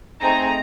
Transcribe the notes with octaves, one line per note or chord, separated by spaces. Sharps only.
A3 C4 D#4 G#4 A#5